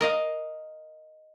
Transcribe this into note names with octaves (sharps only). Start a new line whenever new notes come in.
A#4 D#5 F5